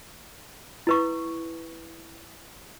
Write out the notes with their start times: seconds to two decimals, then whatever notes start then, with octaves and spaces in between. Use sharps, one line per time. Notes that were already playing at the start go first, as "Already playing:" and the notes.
0.87 E4 B4 C#6